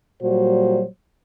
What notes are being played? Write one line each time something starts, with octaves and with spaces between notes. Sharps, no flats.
A#2 F#3 G3 F#4 C5